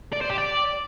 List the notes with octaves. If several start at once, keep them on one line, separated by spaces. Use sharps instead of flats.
D5
C5
G4
D5